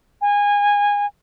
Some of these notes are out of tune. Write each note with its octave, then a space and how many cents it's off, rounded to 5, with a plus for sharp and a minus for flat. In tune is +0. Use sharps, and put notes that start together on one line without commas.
G#5 -20